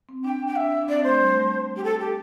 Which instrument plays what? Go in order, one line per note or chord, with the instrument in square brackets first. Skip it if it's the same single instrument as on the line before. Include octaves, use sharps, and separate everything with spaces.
[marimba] C4
[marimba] D4 [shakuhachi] G5
[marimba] D4
[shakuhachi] G5
[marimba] D4 [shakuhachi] E5
[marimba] D4
[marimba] C4 [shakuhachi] D5
[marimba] A3 [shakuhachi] C5
[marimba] G3
A3
G3
[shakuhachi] G4
A4
G4